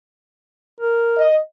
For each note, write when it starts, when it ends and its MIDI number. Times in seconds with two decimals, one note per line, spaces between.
0.80 1.25 70
1.17 1.37 75